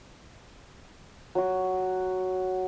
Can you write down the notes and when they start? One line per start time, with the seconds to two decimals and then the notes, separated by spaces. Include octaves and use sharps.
1.35 F#3 F#4